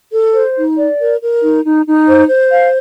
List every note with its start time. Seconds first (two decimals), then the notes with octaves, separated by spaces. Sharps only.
0.13 A4
0.34 C5
0.57 D#4
0.77 D5
1.00 A#4
1.21 A#4
1.42 D#4
1.65 D#4
1.86 D#4
2.08 C5
2.29 C5
2.51 F5